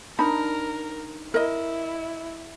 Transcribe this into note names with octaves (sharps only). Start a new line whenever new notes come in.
D4 D#4 A#4 B5
E4 A#4 D#5